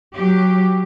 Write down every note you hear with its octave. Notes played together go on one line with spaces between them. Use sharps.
F#3 G4